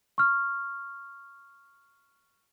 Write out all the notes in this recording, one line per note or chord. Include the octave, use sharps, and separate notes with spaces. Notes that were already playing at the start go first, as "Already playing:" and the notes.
C#6 F6